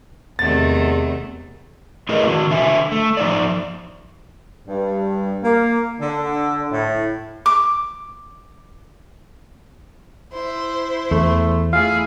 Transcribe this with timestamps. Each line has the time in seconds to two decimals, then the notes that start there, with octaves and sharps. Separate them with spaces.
0.39 E2 C3 D#3 A3 A6
2.09 A3 E4 G#4 A#4 B4 D#5
2.28 D#3 F#4
2.50 D3 E5 G#5
2.92 A3
3.17 F3 D#4 C5 D5
4.68 G2
5.44 A#3
6.00 D3
6.72 A2
7.46 D6
10.32 E4 C5
11.11 E2 A3
11.73 A3 E4 G#4 F5